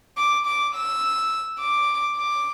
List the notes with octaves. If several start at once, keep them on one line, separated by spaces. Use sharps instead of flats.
D6
D6
E6
D6
D6